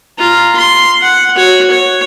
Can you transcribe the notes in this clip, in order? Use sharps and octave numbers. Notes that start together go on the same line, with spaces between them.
F4 A#5
C6
F#5
F#4 C#5
C#5